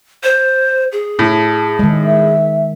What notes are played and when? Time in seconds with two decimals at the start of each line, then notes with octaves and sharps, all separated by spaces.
0.23 C5
0.92 G#4
1.19 A2 A5
1.79 D#3 G#3
2.04 E5